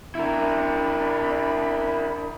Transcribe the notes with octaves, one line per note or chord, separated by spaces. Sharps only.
D4 E4 A#4 A#5 B5